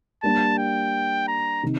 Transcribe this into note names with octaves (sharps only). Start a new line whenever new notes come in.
G3 A#3 D4 A5
G5
A#5
C3 D#3